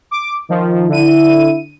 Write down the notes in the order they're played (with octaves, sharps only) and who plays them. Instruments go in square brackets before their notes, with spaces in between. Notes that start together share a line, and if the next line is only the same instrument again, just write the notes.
[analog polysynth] D6
D#3 F3
[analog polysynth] D3 D#7 [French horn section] E4